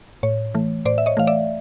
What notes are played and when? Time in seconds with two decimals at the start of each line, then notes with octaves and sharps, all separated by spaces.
0.23 A2 C#5
0.55 E3 A3
0.85 A2 C5 D5
0.98 E5
1.06 C#5 D#5
1.17 E3 A3 F5
1.27 D5 E5